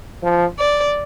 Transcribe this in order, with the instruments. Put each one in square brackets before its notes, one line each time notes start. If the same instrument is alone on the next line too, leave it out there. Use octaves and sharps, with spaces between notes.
[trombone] F3
[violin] D5